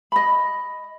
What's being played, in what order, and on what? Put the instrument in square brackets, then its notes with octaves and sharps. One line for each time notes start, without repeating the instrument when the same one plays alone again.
[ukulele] D#5 B5